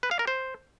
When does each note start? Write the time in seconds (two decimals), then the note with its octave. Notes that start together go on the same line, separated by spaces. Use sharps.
0.03 B4
0.11 F5
0.19 A#4
0.27 C5